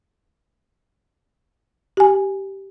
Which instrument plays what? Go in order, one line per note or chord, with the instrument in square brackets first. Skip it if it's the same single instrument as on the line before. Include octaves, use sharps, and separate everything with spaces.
[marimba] G4 G#5